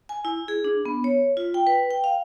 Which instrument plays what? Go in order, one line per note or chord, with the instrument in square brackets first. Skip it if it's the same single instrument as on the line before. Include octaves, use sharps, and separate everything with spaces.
[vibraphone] G#5
E4
G#4
D4
B3
C#5
F4
G5
B4
G5
F5